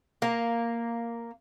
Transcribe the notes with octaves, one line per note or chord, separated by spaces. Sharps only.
A#3